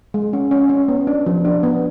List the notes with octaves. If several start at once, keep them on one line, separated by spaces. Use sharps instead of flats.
G#3
C#4
C#4
C#4
B3
D4
F3
D4
B3